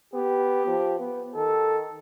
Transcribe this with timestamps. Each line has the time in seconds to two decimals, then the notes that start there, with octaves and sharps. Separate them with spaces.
0.13 B3 G4
0.67 F3
1.00 B3
1.35 D#3 A4